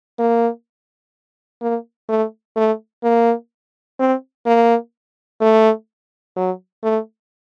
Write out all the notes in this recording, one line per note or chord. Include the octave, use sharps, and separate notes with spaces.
A#3
A#3
A3
A3
A#3
C4
A#3
A3
F#3
A3